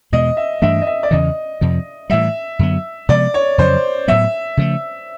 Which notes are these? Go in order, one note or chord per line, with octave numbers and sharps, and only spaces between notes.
E2 B2 G#3 D#5
E5
G2 E3 A3 D4 E5
D#5
E5
D5
E2 C#3 E3 D#5
F2 C3 F3
A2 E3 G3 E5
F#2 D3 F#3 B3
C3 F3 G#3 B3 D5
C#5
F2 C#3 F#3 C5
A2 F#3 B3 E5
C#3 F3 A3